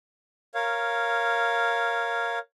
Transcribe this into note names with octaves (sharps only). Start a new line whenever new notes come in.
A#4 C#5 F5